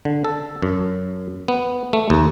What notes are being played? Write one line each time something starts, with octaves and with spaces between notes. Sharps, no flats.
D3
A4
F#2
B3
A3
D#2